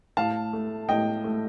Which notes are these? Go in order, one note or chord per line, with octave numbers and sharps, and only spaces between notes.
A2 F5 A5
A3
A2 D#5 G5
A3